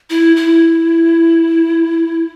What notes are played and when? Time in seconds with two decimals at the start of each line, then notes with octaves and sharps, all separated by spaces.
0.10 E4
0.36 E4